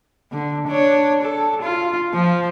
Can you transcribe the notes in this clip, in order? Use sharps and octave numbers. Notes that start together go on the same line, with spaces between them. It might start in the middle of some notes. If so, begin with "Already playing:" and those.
D3
D4 C#5
A4
F4
F3